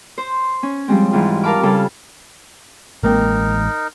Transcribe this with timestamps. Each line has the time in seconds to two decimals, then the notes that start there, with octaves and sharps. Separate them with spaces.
0.18 C5
0.63 C#4
0.88 F3 G3 G#3 C4
1.12 G#2 E3 G3 F4
1.43 A#4 F5 A5 B5 D6 F6
1.63 C#3 G3 A4 A5
3.03 A1 G#3 A#3 C4 D#4 A#4